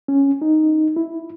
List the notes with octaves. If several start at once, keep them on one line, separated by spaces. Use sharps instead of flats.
C#4
D#4
E4